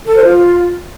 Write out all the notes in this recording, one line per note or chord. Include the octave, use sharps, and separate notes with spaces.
A4
C5
F4